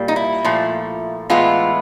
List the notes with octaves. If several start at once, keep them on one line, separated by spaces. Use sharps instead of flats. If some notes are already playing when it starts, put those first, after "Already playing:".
Already playing: A#2 G3 A#3
D#4
E4
A#2 F3 A3
A2 E3 G#3 B3 F4